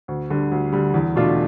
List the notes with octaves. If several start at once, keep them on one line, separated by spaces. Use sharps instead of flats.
D2
D3 G3
D2
D3 G3
E2
B2 A3 D4 F4